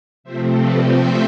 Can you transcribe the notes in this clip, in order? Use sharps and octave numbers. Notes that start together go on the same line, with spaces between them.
C3 F3 A3 C4 C5 E5
B4 D5
C5 E5